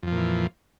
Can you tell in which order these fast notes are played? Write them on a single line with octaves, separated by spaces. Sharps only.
F2 F3 A#2 E3